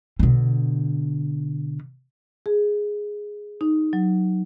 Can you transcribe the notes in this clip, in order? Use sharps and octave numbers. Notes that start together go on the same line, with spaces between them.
B2 D3
G#4
D#4
F#3